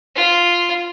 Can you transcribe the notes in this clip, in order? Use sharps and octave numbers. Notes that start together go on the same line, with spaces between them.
F4